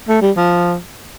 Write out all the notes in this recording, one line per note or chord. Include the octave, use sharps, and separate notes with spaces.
A3
G3
F3